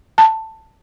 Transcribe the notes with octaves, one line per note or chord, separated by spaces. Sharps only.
A5